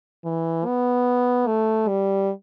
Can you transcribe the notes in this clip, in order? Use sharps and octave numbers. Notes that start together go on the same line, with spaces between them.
E3
B3
A3
G3